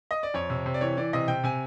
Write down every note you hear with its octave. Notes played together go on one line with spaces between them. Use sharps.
D#5
D5
F2 C#5
C3
C3
D5
E3 C#5
E3 D5
C3 D#5
C3 G5
C3 G#5